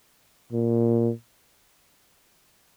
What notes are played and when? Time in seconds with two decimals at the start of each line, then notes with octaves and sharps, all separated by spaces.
0.53 A#2